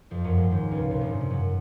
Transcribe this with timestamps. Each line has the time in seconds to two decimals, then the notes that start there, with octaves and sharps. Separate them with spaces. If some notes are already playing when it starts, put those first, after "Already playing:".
0.11 F2 F3
0.24 F#2 F#3
0.37 G#2 G#3
0.51 D#2 D#3
0.71 C#2 C#3
0.90 C2 C3
1.00 A#1 A#2
1.10 G#2
1.21 G#2
1.30 F#2 F#3